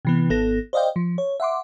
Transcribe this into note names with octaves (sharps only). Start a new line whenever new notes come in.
C3 E3 B3
G#1 B3 A4 A#6
C5 D5 D#5 F5 G5
F3
C#5
E5 F#5 C6 D6